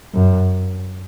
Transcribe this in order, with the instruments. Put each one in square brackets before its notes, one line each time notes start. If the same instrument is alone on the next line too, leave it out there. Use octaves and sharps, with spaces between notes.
[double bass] F#2